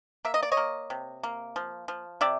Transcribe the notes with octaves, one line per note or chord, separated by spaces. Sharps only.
A#3 E5
D#5
D5
C#5 D#5
A#3
C3
A#3
F3
F3
C3 D5 E5